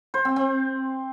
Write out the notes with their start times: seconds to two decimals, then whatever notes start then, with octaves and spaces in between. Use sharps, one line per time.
0.14 C5
0.25 C4
0.36 C4